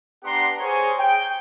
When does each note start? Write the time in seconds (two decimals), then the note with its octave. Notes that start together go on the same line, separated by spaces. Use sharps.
0.24 B3 D4 G4 F#5 A#5 C6
0.61 G#4 A#4 C5 C#5 G#5
0.98 G5